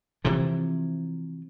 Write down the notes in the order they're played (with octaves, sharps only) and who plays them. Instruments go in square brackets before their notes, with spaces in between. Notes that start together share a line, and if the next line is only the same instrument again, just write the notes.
[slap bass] C3 E3 F3